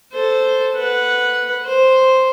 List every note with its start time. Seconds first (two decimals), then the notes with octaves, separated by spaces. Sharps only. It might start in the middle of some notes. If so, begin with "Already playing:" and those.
0.13 A4 C5
0.76 B4 F#5
1.66 C5